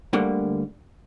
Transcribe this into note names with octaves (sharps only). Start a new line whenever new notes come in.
D2 D3 G3 A#3